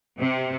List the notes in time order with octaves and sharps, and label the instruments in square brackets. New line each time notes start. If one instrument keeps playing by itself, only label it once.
[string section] C3